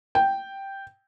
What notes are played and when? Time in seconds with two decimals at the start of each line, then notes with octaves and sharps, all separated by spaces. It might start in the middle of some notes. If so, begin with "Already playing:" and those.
0.15 G5